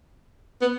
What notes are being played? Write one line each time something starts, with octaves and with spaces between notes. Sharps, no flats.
B3